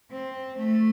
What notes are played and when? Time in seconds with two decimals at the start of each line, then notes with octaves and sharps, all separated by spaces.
0.11 C4
0.57 A3